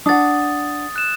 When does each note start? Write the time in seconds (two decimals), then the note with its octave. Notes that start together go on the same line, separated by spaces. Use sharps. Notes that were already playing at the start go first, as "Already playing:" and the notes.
0.06 D4 F#5 D#6 A6
0.96 F#6 E7